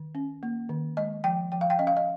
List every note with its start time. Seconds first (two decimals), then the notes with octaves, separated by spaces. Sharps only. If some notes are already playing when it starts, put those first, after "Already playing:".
Already playing: D#3
0.15 C#4
0.43 A#3
0.69 D#3
0.97 G#3 D#5
1.24 F3 G5
1.52 F3 G5
1.61 F5
1.70 G5
1.79 C#4 D#5
1.87 F5
1.97 D#5